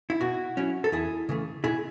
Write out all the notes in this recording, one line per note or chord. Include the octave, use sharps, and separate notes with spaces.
E4
B2 F#4
F#3 C#4 E4
A4
E2 E4 G#4
C#3 E3 A3
B2 E4 G#4